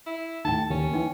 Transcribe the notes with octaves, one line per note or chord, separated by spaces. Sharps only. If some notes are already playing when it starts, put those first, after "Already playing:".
E4
D#2 A2 D#4 G5 A5
D#2 C#4
E3 D#4 G5